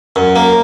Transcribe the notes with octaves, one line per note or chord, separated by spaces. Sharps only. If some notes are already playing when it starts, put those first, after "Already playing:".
F#2
A#3